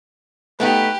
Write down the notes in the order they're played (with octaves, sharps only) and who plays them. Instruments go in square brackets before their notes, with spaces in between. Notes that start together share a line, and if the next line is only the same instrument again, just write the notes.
[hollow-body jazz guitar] A3 B3 D#4 [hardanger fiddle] G4 [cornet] B4